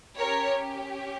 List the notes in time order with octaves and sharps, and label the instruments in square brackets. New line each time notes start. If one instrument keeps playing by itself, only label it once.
[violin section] C#4 G4 A#4 C#5